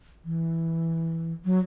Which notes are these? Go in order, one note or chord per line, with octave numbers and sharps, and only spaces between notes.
E3
F#3